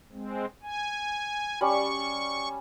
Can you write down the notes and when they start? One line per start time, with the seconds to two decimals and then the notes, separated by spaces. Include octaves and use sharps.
0.12 G#3 C4
0.63 G#5
1.61 G3 C#4 B5 C#6